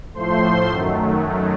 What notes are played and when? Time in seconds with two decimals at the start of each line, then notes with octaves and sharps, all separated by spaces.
0.14 A2 F3 A3 C5 C6
0.70 F#2 D#3 F#3 A3